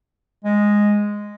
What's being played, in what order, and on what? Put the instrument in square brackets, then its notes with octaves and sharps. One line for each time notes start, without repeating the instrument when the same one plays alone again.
[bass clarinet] G#3